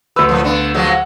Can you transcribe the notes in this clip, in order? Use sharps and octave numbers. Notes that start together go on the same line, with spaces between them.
D2 B4 E6
A2 F3
B3 D4
F3 F#3 G#3
F#5